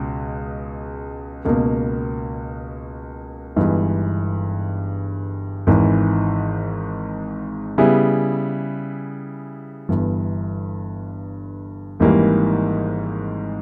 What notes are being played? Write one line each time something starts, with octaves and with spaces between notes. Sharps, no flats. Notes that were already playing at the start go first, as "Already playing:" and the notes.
Already playing: C#2 B2 G#3
C#2 B2 A#3
G1 G2 E3 G#3 D#4
G#1 G#2 E3
C#3 G3 B3 E4 G#4
G1 G2 E3
G#1 G#2 E3 G3 A#3